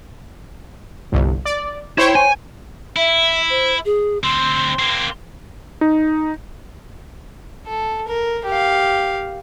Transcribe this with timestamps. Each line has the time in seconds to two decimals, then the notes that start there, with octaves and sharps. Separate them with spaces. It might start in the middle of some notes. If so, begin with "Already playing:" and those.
1.12 G1 C2
1.45 D5
1.98 E4 C5 C#5 G5
2.15 G#5
2.96 E4 E5
3.50 C5
3.85 G#4
4.24 D2 C4 C6
4.79 A#3 C4
5.81 D#4
7.67 A4
8.07 A#4
8.46 G4 F5